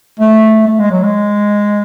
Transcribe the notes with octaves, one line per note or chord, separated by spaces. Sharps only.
A3
A3
G#3
F#3
G#3